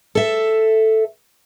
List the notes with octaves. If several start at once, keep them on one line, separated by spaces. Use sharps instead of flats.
A4 E5